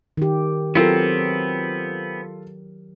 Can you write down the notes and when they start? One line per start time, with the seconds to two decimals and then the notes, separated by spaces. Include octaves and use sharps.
0.17 D#3 G4
0.75 F#3 B3 C4 F4 G4 A4 A#4